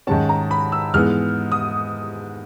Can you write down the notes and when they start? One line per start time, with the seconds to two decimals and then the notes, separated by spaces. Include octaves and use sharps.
0.07 G#2 D#3 G#3 C#4 A5
0.29 A#5
0.51 B5
0.72 E6
0.94 G#2 E3 G#3 B3 F6
1.52 D#6